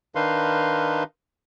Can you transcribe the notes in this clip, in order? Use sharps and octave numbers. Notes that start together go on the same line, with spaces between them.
D#3 D4 D#4 B4 F5 C6